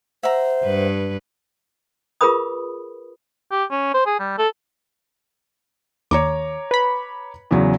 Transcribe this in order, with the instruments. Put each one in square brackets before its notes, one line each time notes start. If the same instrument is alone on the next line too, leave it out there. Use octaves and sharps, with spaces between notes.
[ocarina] C5 [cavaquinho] E5 F#5 A#5
[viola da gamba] G2 B4
[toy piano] F4 G#4 A#4 B4 B5 D#6
[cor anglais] G4
C#4
C5
G#4
G3
A4
[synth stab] D#2 [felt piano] C#5 A#5 D6
[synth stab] B4 B5
[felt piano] E2 C#3 F#3